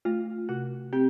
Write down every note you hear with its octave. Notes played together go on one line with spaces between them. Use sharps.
A3 F4
C3 F#4
C4 G4